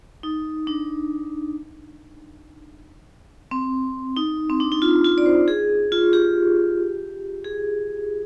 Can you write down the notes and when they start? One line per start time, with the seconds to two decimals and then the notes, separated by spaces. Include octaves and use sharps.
0.23 D#4
0.67 D4
3.51 C4
4.16 D#4
4.50 C4
4.60 D4
4.72 D#4
4.82 F4
5.04 F4
5.18 D5
5.26 C5
5.48 G#4
5.92 F4
6.13 G4
7.45 G#4